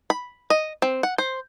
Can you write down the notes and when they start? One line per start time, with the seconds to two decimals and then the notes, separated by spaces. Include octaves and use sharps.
0.10 B5
0.50 D#5
0.82 C4
1.03 F#5
1.18 C5